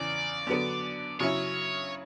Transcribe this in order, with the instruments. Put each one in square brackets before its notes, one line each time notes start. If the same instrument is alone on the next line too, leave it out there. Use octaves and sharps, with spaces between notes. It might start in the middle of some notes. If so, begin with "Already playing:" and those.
Already playing: [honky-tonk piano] E2 C#3 E3 [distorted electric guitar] D5
[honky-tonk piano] D3 F#3 B3 D4
[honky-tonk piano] C#3 F#3 C#4 E4 [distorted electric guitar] C#5